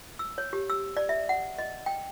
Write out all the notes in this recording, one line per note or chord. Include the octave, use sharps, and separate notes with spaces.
E6
C#5
G4
E6
D5
E5
F#5
D#5
G5